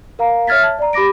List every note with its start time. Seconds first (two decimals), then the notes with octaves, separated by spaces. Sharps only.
0.19 A#4 F5 A#5
0.47 C#5 E5 F6 G#6 A6 B6
0.63 A5
0.79 D5 A#5
0.93 G4 B5 D6 A#6 D7